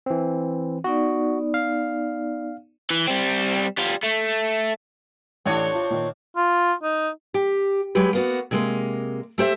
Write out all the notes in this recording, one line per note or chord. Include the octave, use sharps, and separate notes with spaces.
E3 C4
B3 D#4 F#4 D5
F5
E3
G3 C4
G3 F4
A3
A1 A3 C4 D4 C#5
F4
A#2 D#3
F4
D#4
G4
F#3 G#3 G4 B4
A#3 B3 F#4
C3 G#3 A#3
A3 G4 C5 E5